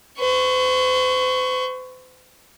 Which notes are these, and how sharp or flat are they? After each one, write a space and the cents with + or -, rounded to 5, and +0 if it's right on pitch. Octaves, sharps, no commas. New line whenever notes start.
C5 -45 C#6 -5